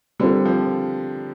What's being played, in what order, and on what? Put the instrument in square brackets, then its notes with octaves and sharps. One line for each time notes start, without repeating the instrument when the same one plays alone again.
[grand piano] D3 [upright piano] G3 C4 F4 A#4
[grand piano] F3